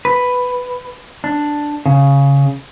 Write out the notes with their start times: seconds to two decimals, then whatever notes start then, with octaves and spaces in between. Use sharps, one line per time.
0.05 B4
1.24 D4
1.86 C#3